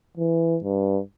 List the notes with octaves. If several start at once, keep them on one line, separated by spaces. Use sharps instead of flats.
E3
G2